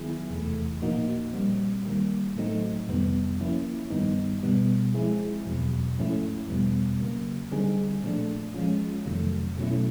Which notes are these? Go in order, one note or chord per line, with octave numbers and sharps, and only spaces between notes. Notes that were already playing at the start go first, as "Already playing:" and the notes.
Already playing: D#3 F#3 B3 E4 G#4
E2 C3 E3 A3
A#2 F3 A#3 D#4 F#4
A#2 G3 C4
D#3 G3 A#3
A2 F#3 A3 C4 D#4
F2 C3 D#3 G3 B3
F3 A#3 C#4 E4
G2 D#3 G3 B3 D#4
B2 G3 B3
F3 G#3 C4 E4 G#4
E2 B2 F#3
G#2 F3 A3 C#4 E4
E2 B2 G3 B3
C#3 F#3 A#3
D3 G3 C4 D#4 G#4
A#2 F3 A3 D4
F3 G#3 C#4 F4
F2 C3 D#3 F#3 A3
B2 F#3 A3 C#4 E4